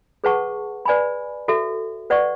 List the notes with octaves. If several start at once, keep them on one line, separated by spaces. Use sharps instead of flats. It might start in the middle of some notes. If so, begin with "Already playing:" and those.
G#4 B4 F#5 A5 C#6
B4 D5 G#5 B5
F#4 A4 E5
B4 D5 F#5 C#6